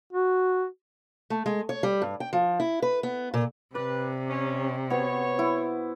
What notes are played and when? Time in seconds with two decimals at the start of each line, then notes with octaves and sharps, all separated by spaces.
0.13 F#4
1.30 A3
1.46 G#3
1.69 C#5
1.83 G3
2.02 G2
2.20 G5
2.33 F3
2.60 E4
2.82 B4
3.03 B3
3.34 A#2
3.75 C3 B4 D5
4.29 C#4
4.90 B3 F#4 C5 C#5
5.38 E4 F#4